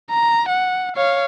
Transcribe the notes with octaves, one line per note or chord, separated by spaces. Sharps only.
A#5
F#5
C#5 F5